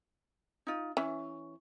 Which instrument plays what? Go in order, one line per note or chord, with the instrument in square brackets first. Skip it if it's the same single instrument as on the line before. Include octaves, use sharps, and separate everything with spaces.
[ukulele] D#4 F4
[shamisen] E3 [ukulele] C#4